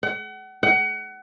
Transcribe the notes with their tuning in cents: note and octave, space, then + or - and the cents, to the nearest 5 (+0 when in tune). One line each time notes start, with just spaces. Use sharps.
F#5 +35
F#5 +30